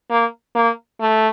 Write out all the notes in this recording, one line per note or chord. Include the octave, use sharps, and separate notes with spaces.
A#3
A#3
A3